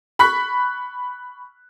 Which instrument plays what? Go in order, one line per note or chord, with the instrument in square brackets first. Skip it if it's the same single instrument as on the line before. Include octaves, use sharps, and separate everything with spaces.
[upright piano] B5 C#6 F#6 B6